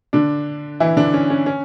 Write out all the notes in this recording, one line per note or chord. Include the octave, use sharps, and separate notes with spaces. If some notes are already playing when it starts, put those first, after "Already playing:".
D3 D4
E3 E4
D3 D4
C#4
C#4
C#4